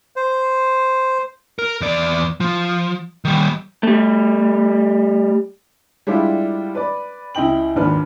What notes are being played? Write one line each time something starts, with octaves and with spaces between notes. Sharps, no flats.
C5
A#4
E2 D5
F3
D#3 G3
G3 A3
G3 G#3 D4 E4 F4 G4
B4 D5
C#2 E4 D#5 G5 F#7
A#1 D#2 G#2 D4 B4 F6